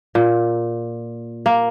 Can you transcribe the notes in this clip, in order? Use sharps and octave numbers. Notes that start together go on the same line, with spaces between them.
A#2
A#3